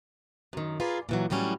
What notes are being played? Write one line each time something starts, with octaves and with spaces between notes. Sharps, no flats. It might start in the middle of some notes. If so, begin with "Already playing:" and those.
F#2 D#3
F4 G#4 A#4 B4 D5
A#2 E3 F#3
A2 E3 F#3 G3 C#4